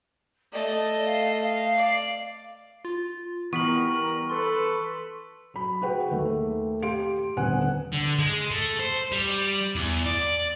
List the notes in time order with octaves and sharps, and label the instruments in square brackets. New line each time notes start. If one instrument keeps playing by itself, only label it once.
[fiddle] A3 D#5 [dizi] D5
[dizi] F5
F5
[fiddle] D5
[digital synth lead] F4
[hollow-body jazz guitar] E3 [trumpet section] G3 A#4 [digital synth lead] B3 [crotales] C#6 B6 F#7
[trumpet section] A4 B4 [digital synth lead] C6
[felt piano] F#3 B5
F#4 G#4 B4 F#5 G5
D#2 A3 A#3
G4 F5 C6 D7
D#1 D3 B3 F#5 G#5 F#6
[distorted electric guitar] D3
G#3
A3
C5
G3
E2
D5